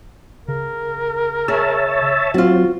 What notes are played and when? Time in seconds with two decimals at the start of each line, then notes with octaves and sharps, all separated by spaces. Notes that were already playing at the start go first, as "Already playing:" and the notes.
0.48 C#3 A#4
1.48 G#4 C#5 E5 A5
2.34 F#3 C4 F4 F#4